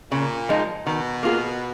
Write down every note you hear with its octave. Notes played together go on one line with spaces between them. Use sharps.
A#2 C#3
F3 G#3 D#4
B2 D#3
A#3 F4 G#4